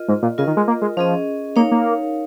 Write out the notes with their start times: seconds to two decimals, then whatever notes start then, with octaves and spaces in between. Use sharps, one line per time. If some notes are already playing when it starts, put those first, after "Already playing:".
Already playing: F4 A#4 D#5
0.08 G#2
0.23 A#2
0.38 C#3 F4 A#4 D#5
0.47 D#3
0.57 G#3
0.68 A#3
0.82 G#3
0.97 F3 C#4 G#4 D#5
1.56 A#3 D#4 A#4 C#5 F5
1.71 A#3